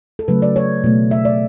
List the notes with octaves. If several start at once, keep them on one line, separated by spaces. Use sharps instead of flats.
A4
C#3 F#3 A3 B4
D5
C#5
B2 A3
E5
D5